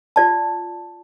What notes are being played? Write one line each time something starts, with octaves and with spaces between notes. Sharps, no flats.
F4 D5 A5